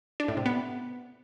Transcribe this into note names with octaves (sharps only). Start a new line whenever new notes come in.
D4
A2
C3
B3